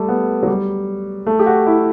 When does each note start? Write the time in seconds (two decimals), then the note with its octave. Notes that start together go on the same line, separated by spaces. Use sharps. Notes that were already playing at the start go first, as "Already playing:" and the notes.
Already playing: G3 A3
0.09 B3
0.43 F#3
0.48 G3
1.27 A3
1.39 G4
1.46 F#4
1.67 E4